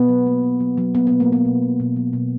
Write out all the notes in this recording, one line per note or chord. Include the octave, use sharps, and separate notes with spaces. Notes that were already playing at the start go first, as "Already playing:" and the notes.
Already playing: B2 B3
F#3
A#3
F#3
F#3
F#3
A#3 B3
B2 B3
A#3
B2 B3
B2
F#3
B2
F#3
B2